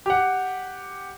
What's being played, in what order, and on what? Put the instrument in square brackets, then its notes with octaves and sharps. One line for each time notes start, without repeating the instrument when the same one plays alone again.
[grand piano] G4 F#5